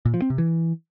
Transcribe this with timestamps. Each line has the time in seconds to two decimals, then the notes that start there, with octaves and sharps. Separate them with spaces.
0.05 A#2
0.14 F3
0.22 C4
0.30 C3
0.38 E3